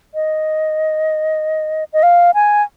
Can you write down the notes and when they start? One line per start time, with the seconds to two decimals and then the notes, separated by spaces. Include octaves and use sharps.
0.14 D#5
1.93 D#5
2.03 F5
2.34 G#5